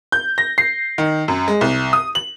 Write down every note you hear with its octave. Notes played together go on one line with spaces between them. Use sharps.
G6
A#6
C7
D#3
F#2
G#3
C2
D#6
F#7